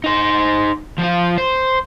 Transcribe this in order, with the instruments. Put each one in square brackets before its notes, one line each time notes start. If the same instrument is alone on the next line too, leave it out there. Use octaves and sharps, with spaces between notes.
[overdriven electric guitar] D#4 C5
F3 F4
C5